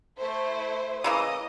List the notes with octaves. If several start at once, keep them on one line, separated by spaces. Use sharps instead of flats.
A3 E4 C5
C#3 E3 A#3 D#5 D#6